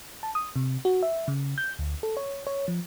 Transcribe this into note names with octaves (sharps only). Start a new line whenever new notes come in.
A5
D#6
C3
F#4
E5
C#3
G6
D2
A4
C#5
C#5
F3